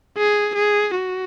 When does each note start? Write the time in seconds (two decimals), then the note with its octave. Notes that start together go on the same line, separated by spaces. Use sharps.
0.17 G#4
0.55 G#4
0.95 F#4